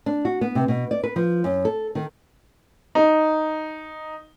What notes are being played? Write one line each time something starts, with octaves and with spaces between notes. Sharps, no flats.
D4
F#4
B3
C3
B2
D5
B4
F3
F#2
A4
D#3
D#4